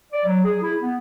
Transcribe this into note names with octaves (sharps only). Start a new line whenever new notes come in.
D5
F#3
G#4
E4
B3